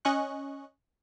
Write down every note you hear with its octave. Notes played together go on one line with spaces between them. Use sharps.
C#4 D#5 C#6 F#6